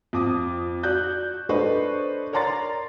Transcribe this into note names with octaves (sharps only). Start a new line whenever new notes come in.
F2 D6 D#6
F#4 D5 F#6 G6
D4 A4 B4 C5 D#5 C#6
A#4 C#5 D5 A#5 C6 A6